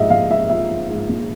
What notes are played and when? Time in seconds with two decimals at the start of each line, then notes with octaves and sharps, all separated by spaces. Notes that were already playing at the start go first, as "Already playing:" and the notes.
Already playing: A#1 G#2 F3 D#5 E5
0.10 A#1 F5
0.30 G#2 E5
0.50 F3 E5
0.70 F3
0.90 G#2
1.09 A#1